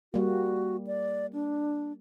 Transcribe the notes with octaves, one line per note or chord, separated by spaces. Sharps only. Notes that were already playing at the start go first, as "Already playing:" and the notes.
G3 A#3 F#4
D5
D4